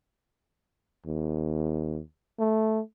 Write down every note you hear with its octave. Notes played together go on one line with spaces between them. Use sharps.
D#2
A3